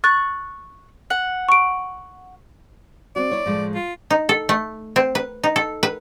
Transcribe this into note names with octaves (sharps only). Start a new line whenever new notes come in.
C#6 F#6 A6
F#5
C#6 D7
C4 F#4 D5
E4 C#5
A2 F3 G#3
F4
D#4
A4
A3
C4
B4
D#4
A4
B4